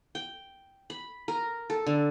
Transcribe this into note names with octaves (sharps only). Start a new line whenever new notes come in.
G5
B5
A#4
A4
D3